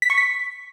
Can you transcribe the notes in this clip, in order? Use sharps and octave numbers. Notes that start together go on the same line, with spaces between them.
B6
C#6
B6